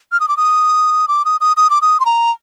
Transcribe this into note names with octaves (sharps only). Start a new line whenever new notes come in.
F6
D#6
D6
D#6
D6
D#6
D#6
D#6
D6
D#6
C6
A#5